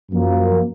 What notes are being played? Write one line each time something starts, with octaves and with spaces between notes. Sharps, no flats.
F#2 F3 A#3